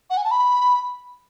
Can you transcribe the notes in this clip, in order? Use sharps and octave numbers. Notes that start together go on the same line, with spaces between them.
F#5
G#5
A5
B5